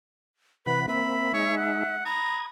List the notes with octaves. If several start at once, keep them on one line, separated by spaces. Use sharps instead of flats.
C3 E3 B4 F#5 B5
A#3 C4 E5 B5
G#3 D#4 C#5
F#5
A#5 B5 D#6 G#6